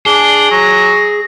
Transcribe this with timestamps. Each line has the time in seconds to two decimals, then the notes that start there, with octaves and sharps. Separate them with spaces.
0.06 D4 G#4 G7
0.51 F#3 A#6